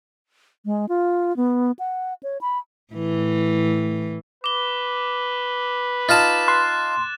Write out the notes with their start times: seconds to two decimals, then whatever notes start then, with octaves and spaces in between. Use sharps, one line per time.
0.65 G#3
0.89 F4
1.37 B3
1.79 F#5
2.23 C#5
2.41 B5
2.94 A2 E3
4.44 B4 D6 G7
6.09 D#4 F4 A5 A6 E7
6.48 C6 F#6